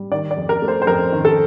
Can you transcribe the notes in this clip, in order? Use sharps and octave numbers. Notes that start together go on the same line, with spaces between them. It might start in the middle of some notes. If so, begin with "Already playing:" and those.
Already playing: G3
D#3 D5
D5
F2
A#4
A3
C5
C5
F2 A#4
D#3
A4